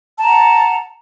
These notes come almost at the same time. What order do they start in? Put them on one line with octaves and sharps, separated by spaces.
A5 A#5 F#5